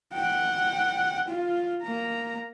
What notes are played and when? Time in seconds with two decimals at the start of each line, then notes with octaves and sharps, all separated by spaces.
0.13 F#5 G5
1.28 F4
1.83 A#3 A#5